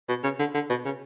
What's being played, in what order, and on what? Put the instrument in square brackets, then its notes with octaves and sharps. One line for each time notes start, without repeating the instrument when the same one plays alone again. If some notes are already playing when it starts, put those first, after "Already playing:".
[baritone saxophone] B2
C#3
D3
D3
B2
C#3